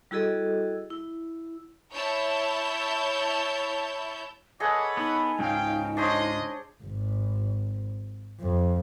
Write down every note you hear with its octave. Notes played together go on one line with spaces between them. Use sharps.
G3 E4 F#4 G#4 A4 D#5
E4
E4 C#5 A5 G6
G#4 A4 B4 C#5 D#5 F#5 D6
B3 D#4
C#2 G#2 C#3 F5 G5
G#3 D4 C5 C#5 D#5
G#1
F2